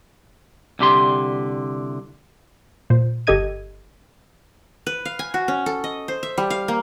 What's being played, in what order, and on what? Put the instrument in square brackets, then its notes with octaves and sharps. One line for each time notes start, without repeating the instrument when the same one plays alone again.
[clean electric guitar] C2 D3 G4 C6
[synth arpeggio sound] A#2 C5
G1 G4 A4 D#5 G#6 D#7
[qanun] B4
F5
G#5
F#4
C#4
A4
D#5
C5
E5
G3
F5
A#3